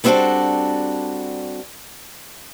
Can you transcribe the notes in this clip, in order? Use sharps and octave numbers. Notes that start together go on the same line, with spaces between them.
G3 B3 C4 D4 F#4 A4